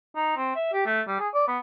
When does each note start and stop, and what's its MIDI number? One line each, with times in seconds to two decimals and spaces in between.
0.16 0.32 63
0.36 0.53 60
0.55 0.69 76
0.73 0.83 67
0.86 1.01 57
1.08 1.19 55
1.19 1.28 68
1.34 1.44 74
1.48 1.59 59